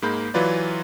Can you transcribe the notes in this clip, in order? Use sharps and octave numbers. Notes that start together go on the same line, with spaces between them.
G#2 G#3 A#3 B5 G6
E3 F#3 F4 B4 D5